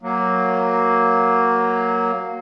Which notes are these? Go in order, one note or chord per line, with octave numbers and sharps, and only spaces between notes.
F#3 A#3